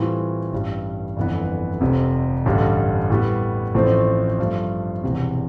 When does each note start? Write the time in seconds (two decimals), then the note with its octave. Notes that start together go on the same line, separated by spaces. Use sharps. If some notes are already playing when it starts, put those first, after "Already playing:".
Already playing: A2 E3 G3 C4 F4
0.52 A1 G2 E3 G3
1.17 G1 F2 E3 B3
1.81 F1 F2 C3
2.46 A1 G2 D3 G3
3.10 A2 G3 B3
3.74 A1 A2 F3 A3 C4
4.39 G2 F3 A3
5.03 E1 E2 C3